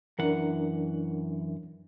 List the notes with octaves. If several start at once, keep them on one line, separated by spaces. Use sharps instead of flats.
F#2 E3 D4 A#4 F#5